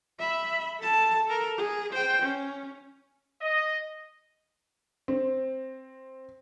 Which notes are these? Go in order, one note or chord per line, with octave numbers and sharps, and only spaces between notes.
E5 B5
A4 A5
A4 A#4
G#4
C5 G5
C#4
D#5
C4